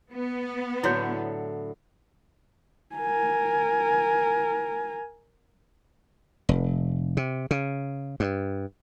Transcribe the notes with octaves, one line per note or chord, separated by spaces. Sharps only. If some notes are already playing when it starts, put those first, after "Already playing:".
B3
A2 D3 F#3 E4 F#4 C#5
A#4 G#5
F1
C3
C#3
G2